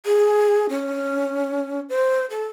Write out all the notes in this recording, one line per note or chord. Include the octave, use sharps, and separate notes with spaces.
G#4
C#4
C5
A4